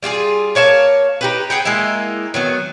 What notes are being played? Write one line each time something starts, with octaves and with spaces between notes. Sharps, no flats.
G3 F4 F#4 G#4
A#3 C#5 F5 A5
D#4 G4 B4
G#4 F#5 G5
G#3 A#3 D#4 E4
D#3 F#3 B3